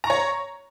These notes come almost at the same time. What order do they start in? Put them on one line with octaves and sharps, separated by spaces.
A#5 C#6 C#5